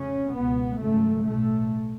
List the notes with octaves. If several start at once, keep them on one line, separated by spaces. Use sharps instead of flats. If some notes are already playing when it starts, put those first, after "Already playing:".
Already playing: F1 C#3 C#4
C#2 B2 B3
G#1 F#2 C#3 A3
B1 A2 A3